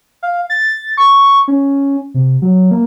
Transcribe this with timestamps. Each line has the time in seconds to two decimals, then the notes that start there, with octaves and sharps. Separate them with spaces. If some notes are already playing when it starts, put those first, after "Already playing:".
0.23 F5
0.50 A6
0.97 C#6
1.48 C#4
2.14 C3
2.42 F#3
2.71 A#3